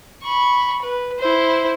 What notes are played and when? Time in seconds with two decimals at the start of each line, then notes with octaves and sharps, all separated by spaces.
0.23 B5 C#6
0.82 B4
1.19 E4 C5